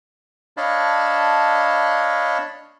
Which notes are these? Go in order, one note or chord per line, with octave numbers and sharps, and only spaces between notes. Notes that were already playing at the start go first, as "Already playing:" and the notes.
D4 C#5 D#5 F5 A5 B5